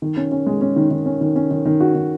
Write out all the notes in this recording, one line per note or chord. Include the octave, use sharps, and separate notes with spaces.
D#3
C#4
C#4
G#3
C#4
D#3
D#3
C#4
D#3
C#4
D#3
D#3
F#4
D#3